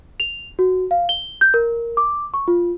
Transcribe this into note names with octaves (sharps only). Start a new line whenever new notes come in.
F7
F#4
F5
G7
G6
A#4
D6
C#6
F4